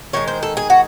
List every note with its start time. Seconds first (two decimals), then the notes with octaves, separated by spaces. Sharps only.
0.13 D#3 G#3 C#5
0.28 C5
0.43 A4
0.57 G#4
0.70 F#4